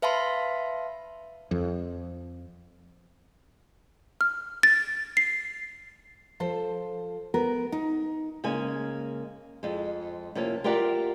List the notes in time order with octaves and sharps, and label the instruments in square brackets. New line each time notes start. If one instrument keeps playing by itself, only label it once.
[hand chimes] B4 E5 F5 A5 B5 C6
[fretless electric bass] F2
[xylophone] F6
A6
C7
[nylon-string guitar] F3 A4 C5
B3 A#4
D#4
C#3 G#3 A#3 G#5
F2 G#3
C3 F3 A#3 C#4
F4 G4 A#4 D5 E5 F#5